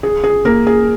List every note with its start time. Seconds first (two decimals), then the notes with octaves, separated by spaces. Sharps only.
0.03 G#4
0.24 G#4
0.45 A#3 A#4
0.67 G#4